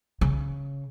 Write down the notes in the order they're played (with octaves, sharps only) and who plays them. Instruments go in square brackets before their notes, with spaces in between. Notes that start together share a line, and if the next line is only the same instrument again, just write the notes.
[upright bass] C#3